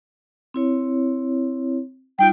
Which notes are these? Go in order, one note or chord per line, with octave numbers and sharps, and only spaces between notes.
C4 E4 C#5
G3 D#4 F4 G5